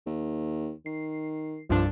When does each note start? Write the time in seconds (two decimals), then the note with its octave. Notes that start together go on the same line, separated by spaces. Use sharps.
0.06 D#2
0.86 D#3 C7
1.70 C2 G2 F3 D4